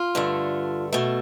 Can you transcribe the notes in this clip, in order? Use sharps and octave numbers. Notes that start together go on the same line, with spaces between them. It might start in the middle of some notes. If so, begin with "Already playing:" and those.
Already playing: F4
G2 D3 A3
B2 A3